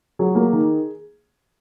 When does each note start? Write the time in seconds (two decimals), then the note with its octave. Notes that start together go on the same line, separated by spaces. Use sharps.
0.19 F#3 G#4
0.35 A#3
0.53 D#3